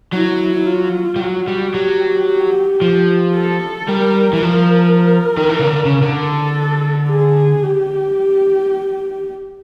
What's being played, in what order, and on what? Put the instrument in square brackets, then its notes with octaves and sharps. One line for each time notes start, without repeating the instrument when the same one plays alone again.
[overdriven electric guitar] F#3 [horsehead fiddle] E4
[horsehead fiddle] F4
[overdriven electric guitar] G3
[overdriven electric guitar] F#3 [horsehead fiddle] F#4
[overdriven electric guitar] G3
[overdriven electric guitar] F#3 [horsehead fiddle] G4
[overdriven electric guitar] F3
[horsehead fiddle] A4
[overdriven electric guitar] G3 [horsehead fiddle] A#4
[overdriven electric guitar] E3
[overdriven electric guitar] F3 [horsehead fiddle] A#4
[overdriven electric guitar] D#3
E3
C#3
D3
C#3
[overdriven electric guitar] D3 [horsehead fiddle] A4
[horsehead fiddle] G#4
G4